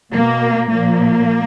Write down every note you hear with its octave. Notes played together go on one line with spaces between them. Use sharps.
B2 A#3
A#2 F3 A#3